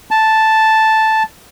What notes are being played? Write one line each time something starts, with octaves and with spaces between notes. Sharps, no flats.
A5